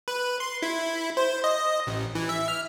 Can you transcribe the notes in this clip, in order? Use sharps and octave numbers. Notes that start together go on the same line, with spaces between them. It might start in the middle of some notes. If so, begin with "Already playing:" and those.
B4
C6
E4
C5
D#5
A1
E3
E5
F6